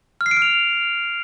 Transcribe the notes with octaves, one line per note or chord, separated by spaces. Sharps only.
F6
C7
D7
F6
F7